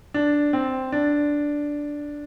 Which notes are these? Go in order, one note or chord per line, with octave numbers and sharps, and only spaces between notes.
D4
C4
D4